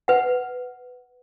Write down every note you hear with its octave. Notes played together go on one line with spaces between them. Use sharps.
B4 F#5